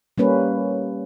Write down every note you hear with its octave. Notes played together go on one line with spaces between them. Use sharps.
G3 A#3 C#4 B4